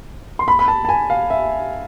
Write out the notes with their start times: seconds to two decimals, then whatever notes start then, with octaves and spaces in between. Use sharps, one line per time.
0.39 C6
0.48 B5
0.59 B5
0.68 A5
0.85 A5
0.89 G#5
1.10 F5
1.30 E5